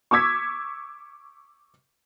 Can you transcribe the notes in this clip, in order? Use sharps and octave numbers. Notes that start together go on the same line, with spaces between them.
C#6 D6 E6 G#6 B6